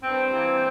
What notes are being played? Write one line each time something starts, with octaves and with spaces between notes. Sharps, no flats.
G2 C4
E3 G3 A#3